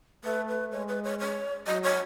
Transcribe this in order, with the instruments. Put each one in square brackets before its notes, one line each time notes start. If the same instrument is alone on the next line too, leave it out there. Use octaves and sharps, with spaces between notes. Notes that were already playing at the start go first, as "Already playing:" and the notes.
[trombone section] A3 [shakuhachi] B4
[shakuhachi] B4
[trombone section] G#3 [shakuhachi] C#5
[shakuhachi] B4
C#5
C#5
[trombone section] F#3 [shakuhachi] D#5
[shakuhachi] C#5